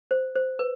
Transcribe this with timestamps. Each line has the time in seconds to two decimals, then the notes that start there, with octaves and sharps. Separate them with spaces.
0.11 C5
0.36 C5
0.59 B4